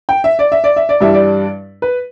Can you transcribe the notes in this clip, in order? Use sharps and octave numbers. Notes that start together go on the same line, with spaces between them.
G5
E5
D5
E5
D5
E5
D5
G2 E3 G3 D4 E5
D5
B4